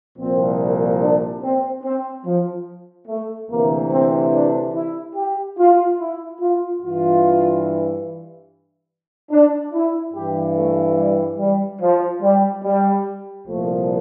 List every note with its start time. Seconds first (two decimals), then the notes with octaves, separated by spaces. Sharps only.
0.17 C2 A#2 F3 C4
1.01 D4
1.42 C4
1.83 C4
2.25 F3
3.08 A3
3.49 D2 C3 E3 A#3
3.91 C4
4.33 D4
4.73 E4
5.15 G4
5.57 F4
5.98 E4
6.40 F4
6.82 G2 E3 F4
9.31 D4
9.73 E4
10.14 G2 E3 G4
10.55 A3
10.97 G3
11.39 G3
11.81 F3
12.21 G3
12.63 G3
13.46 C2 A#2 F3 A3